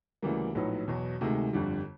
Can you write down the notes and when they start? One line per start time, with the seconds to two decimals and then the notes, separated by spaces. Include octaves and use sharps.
0.22 D2 C#3 E3 G3 A#3
0.55 A#1 A2 F#3 B3 D#4
0.88 E2 B2 F#3
1.21 D2 C3 D#3 G#3
1.53 G1 F2 D3 G3